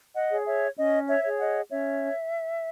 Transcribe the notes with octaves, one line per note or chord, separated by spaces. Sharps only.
D#5 F#5
G#4 C#5
C#5 E5
C#4 D#5
C#5 E5
G#4 C#5
D#5 F#5
C#4 C#5 E5